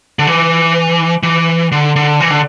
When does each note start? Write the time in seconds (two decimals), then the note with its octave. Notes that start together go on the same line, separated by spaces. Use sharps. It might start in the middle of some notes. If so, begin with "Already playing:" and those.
0.19 D3
0.27 E3
1.23 E3
1.72 D3
1.96 D3
2.20 E3
2.30 D3